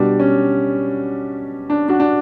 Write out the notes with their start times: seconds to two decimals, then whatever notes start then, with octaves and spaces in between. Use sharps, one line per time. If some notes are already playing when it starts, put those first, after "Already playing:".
Already playing: B2 G3 D4
0.20 C#4
1.70 D4
1.89 D4 F#4
2.00 D4